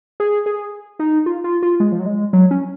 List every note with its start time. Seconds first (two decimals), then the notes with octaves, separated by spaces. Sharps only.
0.20 G#4
0.46 G#4
0.99 D#4
1.26 F4
1.44 F4
1.63 F4
1.80 G#3
1.92 F3
2.00 F#3
2.06 G#3
2.33 F#3
2.51 C#4